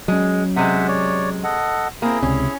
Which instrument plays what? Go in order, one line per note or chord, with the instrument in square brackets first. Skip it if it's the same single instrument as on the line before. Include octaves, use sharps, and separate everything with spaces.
[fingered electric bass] F#3 C#4 [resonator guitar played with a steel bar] G#3
[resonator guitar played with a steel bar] C3 G#3 [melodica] C5 E5 F#5
[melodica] C#5 D5
A4 D#5 F#5
[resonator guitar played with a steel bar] A#3 C4 [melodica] E4 G#4
[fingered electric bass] C#2 C3 [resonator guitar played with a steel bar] C#4